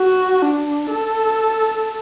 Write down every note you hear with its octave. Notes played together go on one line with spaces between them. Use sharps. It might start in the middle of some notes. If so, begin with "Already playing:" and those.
Already playing: F#4
D4
A4